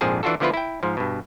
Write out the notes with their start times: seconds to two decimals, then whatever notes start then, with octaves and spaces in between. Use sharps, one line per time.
0.01 A#1 F2 G#2 F3 G#4 A5
0.23 E3 D4 F4 F#4 A4
0.40 D3 F3 B3 E4 F4 B4
0.54 E4 G5
0.83 G#2 F3
0.97 G2 B2